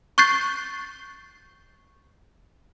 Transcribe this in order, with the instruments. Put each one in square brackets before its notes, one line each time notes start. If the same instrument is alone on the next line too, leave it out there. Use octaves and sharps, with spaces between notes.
[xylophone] C#6 F#6 G6 A6 C7